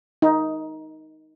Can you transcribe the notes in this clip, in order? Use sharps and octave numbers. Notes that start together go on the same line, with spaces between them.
D#4